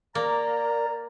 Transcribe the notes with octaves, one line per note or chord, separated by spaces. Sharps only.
A#3 A#4 D5 A#5